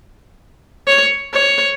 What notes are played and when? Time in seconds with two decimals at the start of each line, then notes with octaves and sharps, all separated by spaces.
0.87 C#5
1.34 C#5